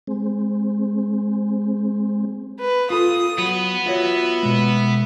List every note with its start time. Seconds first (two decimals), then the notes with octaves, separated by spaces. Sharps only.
0.07 G#3 C4
2.59 B4
2.90 F4 A4 D#6
3.38 F#3 B3
3.86 F4 F#4 C#5 E5
4.43 B2 G#3